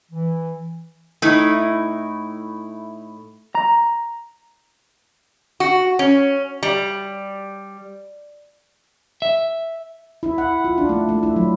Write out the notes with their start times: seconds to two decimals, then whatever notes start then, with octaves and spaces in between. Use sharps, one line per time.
0.11 E3
1.22 A2 A3 D#4 E4
3.55 A#5
5.60 F#4
5.99 C#4
6.63 G3
9.22 E5
10.23 E4
10.38 F#5
10.64 F4
10.78 D4
10.89 A3
11.09 A3
11.23 E4
11.36 F#3